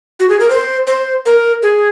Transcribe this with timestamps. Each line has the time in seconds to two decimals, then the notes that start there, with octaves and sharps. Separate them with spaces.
0.20 F#4
0.29 G#4
0.40 A#4
0.50 C5
0.87 C5
1.26 A#4
1.63 G#4